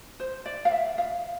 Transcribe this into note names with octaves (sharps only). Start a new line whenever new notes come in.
C5
D5
F5
E5
F5